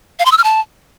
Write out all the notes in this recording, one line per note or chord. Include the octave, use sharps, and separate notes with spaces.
F5
C6
E6
F6
A5